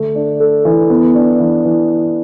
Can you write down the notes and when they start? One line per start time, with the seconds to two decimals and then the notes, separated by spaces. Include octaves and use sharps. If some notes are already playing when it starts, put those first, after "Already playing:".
Already playing: D3 A3
0.15 D4
0.40 A4
0.65 E3
0.90 B3
1.15 D4
1.40 E3
1.65 E3